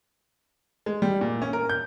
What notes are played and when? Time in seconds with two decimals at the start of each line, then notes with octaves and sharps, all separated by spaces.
0.86 G#3
1.02 G3
1.21 A#2
1.42 C#4
1.53 A#4
1.69 G6